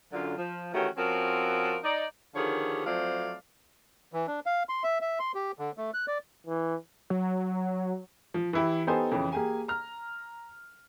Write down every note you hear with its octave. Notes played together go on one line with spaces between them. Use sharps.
F#2 D3 F4
F3
D#3 E3 A3 C#4 F#4 G4
F3 C4 C#4 F#4 A#4
D#4 D5
D3 D#3 F3 G4 G#4 C#5
F3 F#3 A3 C4 D5 F5
E3
D4
F5
C6
E5
E5
C6
G4
D3
A3
F#6
D5
E3
F#3
F3
E3 E4 G4
B3 D#4 G4 A4 C5 G#5
F2 C#3 E3
A#3 G4 G#4 G#5
A#5 F6